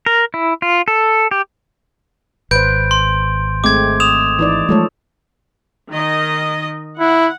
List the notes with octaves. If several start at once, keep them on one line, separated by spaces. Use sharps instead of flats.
A#4
E4
F4
A4
G4
G#1 B4 C5 G6 D7
C6
G#3 A3 C4 D6 G#6
D#6 E7 F7
E3 D#4 D5
F3 G#3 A3 A4 C#5
D#3 D#5
E4 F#5